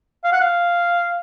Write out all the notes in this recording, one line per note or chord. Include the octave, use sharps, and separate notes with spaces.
F5
F#5
F5